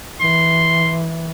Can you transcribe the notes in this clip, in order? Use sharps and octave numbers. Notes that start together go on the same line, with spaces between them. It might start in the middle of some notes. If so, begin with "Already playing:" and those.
E3 C6